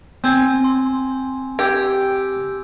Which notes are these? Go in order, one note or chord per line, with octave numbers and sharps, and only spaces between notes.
C4 G#5 G#6
C6
G4 D6 E6 G#6